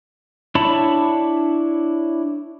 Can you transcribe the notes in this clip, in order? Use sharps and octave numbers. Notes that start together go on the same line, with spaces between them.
D4 E4 C#5 A5 B5